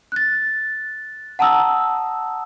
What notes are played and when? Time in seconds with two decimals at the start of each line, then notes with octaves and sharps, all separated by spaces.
0.12 F#6 A6
1.39 F#5 A5 A#5 D#6 E6